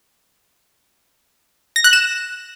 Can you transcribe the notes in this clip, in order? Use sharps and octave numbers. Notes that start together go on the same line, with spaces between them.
A#6
F#6
E7